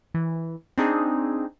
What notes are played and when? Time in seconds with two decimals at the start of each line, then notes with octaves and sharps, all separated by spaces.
0.14 E3
0.78 C4 D4 D#4 G#4